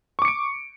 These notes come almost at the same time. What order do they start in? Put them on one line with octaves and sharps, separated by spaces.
C#6 D6 C#7 D7